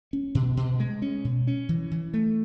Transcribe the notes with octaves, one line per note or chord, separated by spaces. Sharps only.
C#4
B2
B2
G#3
C#4
B2
C#4
E3
E3
A3